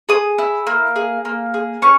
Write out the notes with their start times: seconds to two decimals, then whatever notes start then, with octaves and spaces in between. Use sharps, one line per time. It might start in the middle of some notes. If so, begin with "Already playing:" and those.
0.09 G#4 D#6
0.38 E4
0.67 A#3
0.96 G#4
1.25 A#3
1.54 G#4
1.82 C#4 C#6